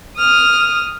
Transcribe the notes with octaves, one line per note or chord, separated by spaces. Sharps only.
D#6 F6